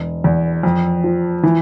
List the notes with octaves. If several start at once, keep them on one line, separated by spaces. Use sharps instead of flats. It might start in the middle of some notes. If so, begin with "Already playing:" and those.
Already playing: E1
E2
F2
F3
E3